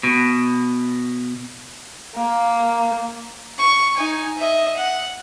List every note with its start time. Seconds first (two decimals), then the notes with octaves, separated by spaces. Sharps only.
0.03 B2
2.15 A#3
3.59 C#6
3.97 D#4 G#5
4.38 D#5 E5
4.77 F#5